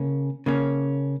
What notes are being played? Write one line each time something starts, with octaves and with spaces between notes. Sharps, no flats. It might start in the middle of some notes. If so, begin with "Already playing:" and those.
Already playing: C#3 A#3 C#4
C#3 A#3 C#4